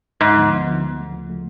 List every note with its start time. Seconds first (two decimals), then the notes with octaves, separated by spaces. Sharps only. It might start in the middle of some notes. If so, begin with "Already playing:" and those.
0.21 D2 G#2
0.35 D3 F3 B3
0.51 D2
0.66 D3 F3 B3
0.82 D2
0.97 C#3 F3 A3
1.12 D2
1.27 C#3 F3 A3